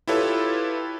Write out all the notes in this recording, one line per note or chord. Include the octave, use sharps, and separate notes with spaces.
E4 F4 G4 A4 B4 C#5